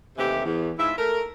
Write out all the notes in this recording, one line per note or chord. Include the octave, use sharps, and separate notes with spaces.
D#2 C3 E3 A3 G4
E2
G#2 E4 F4 E5
A3 A#4